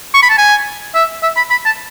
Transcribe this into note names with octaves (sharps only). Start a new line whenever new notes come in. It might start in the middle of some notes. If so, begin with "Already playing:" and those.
C#6
B5
A5
G#5
E5
E5
B5
B5
A5